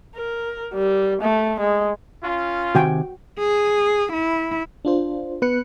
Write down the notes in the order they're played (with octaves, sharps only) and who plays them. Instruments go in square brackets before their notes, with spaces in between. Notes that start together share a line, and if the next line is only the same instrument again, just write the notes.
[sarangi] A#4
G3
A3
G#3
[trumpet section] C#4 F4
[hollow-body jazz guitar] C3 D#3 G#5 [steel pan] F#4 G5
[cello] G#4
E4
[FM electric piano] D4 F4 C5
B3 B4 F#6 C#7